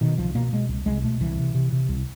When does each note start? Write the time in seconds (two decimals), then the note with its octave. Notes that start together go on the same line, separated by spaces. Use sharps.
0.01 B2 D#3
0.18 C2 F3
0.35 B2 A#3
0.53 B2 G#3
0.69 C2
0.86 C2 G#3
1.04 B2 A3
1.20 C2 E3
1.38 C3
1.55 C3
1.72 C3
1.89 C2